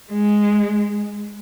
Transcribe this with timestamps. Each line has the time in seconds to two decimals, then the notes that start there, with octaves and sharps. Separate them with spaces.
0.12 G#3